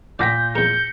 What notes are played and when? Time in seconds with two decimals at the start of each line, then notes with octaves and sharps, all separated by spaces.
0.19 A#2 D5 F#5 G5 G6 A#6 B6
0.55 E2 A#4 G6 C#7